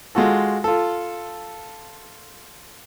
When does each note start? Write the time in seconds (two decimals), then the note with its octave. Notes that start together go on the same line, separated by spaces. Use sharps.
0.15 G#3 F4 F#4 A4
0.64 F4 A4